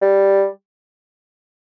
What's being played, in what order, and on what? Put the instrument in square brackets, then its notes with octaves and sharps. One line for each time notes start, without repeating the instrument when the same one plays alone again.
[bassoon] G3